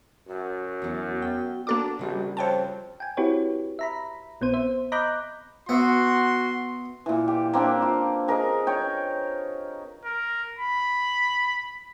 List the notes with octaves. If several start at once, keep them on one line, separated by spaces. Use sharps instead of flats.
F#2 F#4
E2 F#3
G5
A#3 D4 F#4 A4 D6
A#1 C#3 G3 F#4
F2 C5 C#5 G5 A5
G5 G#5
C4 E4 F#4 G4 B4 C#5
E5 A#5 B5
A#1 B3 C4 C5 D#7
C5 E5
D#5 A#5 B5 D6 F#6 G6
B3 F#4 E5 C6
A#2 E3
G4
A#3 C4 D4 G4
F4
G#4 A#4 B4 D#5
C#5 G5
A#4
B5